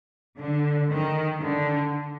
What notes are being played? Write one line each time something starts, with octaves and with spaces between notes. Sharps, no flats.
D3
D#3
D3